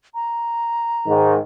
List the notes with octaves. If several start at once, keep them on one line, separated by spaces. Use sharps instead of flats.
A#5
G#2 D#3